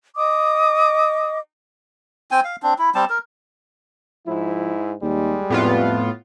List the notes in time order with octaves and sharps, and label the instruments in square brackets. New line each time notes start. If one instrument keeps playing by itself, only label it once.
[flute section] D#5 D6 D#6
[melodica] C4 G5 G#5
F5
C4 D4
E4
G3 C4 A5
A#4
[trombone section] G#2 E4 [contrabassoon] F3
[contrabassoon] D#2 [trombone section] G3 G#3
[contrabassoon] F2 [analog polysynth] A2 B3 F4